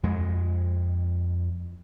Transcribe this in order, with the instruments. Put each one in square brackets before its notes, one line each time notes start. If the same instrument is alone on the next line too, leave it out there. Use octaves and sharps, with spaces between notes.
[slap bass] F2 G#3